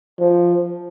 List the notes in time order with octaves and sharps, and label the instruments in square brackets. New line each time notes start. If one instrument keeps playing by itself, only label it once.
[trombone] F3